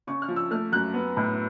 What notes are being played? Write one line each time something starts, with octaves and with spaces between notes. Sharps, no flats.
C#3 C#6
F6
F3
E6
A3 F6
F#2 F#6
B3
A2